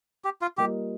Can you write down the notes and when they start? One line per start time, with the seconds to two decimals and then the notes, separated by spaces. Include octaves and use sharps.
0.24 G4
0.42 F4
0.57 G3 A#3 F4 G4 A#4 D#5